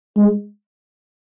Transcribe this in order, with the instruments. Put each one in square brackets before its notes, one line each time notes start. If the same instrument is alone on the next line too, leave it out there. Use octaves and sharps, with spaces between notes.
[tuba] G#3